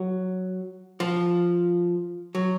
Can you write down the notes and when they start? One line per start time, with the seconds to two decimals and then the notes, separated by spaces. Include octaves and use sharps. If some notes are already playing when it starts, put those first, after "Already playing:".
Already playing: F#3
1.00 F3
2.35 F#3